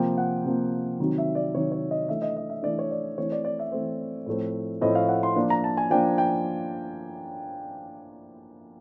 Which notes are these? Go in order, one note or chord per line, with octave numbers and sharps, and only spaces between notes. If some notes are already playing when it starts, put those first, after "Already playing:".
Already playing: C3 F3 A#3 G5
F#5
C3 F3 A#3
C3 D#3 F#3
E5
D5
C3 D#3 F#3 C#5
C#5
D#5
E3 A3 D4 E5
D#5
D#5
E5
E3 A3 D4 D5
C#5
D5
E3 A3 C4 C#5
D5
D5
E5
E3 A3 C4
A2 F3 A3 C4
A2 F3 A3 C4 D#5
F5
F#5
C6
F3 A#3 D4
A#5
A5
G#5
F3 A#3 D4 G5
G5